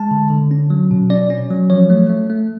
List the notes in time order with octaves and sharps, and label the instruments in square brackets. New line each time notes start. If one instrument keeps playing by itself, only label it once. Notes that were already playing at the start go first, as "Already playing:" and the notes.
Already playing: [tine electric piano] G#3 A5
D3
D3
C#4
F#3
B2
C#4 D5
C#4
F#3
F3 C#5
A3
A3
A3